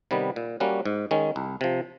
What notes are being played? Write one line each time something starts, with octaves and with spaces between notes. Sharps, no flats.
C3 D#3 G3 B3
A#2
G3 A#3 C#4 F#4
G#2
D#3 G#3 C#4
C2
C3 F3